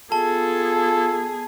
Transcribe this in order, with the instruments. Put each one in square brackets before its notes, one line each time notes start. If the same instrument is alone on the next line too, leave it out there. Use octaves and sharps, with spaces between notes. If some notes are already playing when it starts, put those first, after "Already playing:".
[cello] B3 G#4 [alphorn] F4 [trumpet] A4 [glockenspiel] A5